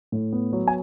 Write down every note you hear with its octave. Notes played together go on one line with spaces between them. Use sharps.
A2
B3
F#3
G#5